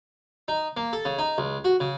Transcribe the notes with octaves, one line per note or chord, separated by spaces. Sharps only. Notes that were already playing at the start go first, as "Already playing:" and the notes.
D#4
A#3
A4
C#3
D#4
C#2
F#4
C#3